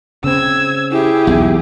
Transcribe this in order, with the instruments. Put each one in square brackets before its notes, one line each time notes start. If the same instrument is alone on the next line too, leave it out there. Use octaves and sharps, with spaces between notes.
[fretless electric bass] C#3 C4 [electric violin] E6 G#6
[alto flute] E4 [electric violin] G4 G#4
[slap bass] B1 [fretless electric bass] E2